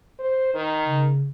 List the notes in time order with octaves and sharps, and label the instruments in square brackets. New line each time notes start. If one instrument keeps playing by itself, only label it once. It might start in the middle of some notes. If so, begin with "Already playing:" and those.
[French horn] C5
D#3
[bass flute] C#3